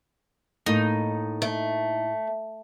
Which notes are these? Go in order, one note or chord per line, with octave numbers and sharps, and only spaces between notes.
A2 A#3 D#4
A3